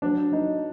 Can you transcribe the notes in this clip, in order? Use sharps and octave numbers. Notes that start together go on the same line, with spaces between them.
F#3 D4
F#3 D#4